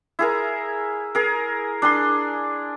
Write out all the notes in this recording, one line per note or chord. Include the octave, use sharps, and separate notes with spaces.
E4 G#4 A#4
G#4 A#4
D4 G#4 C6